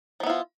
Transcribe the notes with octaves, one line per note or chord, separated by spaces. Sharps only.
F3 B3 E4 F4